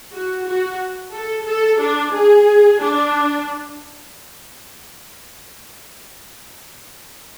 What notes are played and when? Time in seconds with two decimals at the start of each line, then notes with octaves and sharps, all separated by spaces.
0.12 F#4
0.45 F#4
1.13 A4
1.47 A4
1.81 D4
2.14 G#4
2.81 D4